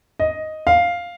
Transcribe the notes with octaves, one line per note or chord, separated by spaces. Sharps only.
D#5
F5